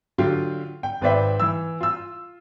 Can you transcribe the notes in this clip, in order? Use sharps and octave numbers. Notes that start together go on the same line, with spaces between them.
D3 F#3 F4 G4
G5
G#1 B4 C5 D5 E5 G5
E3 E6
F4 E6